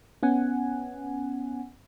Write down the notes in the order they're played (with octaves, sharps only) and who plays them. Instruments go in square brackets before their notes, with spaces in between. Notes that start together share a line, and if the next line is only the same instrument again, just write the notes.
[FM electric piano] B3 C#4 F#5 G#5